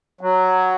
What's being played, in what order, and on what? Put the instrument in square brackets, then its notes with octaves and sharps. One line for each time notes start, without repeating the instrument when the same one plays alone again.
[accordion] F#3